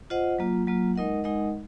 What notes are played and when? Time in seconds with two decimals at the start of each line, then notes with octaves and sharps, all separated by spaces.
0.10 F4 C5 D#5 F#5
0.39 F#3 A#3 F4
0.67 F#3 A#3 F4
0.96 G#3 D#4 A#4 D#5 F#5
1.24 G#3 D#4 A#4 D#5 F#5